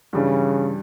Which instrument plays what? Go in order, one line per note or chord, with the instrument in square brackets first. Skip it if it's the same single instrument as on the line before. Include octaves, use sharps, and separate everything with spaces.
[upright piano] G2 E3 G3 [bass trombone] C#3